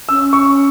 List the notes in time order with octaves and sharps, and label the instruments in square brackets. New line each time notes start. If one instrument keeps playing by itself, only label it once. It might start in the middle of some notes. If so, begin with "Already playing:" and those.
[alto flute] C#4 [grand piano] E6
[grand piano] C#6